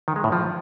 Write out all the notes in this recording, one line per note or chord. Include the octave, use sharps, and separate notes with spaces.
D#3
G#3
A2
F3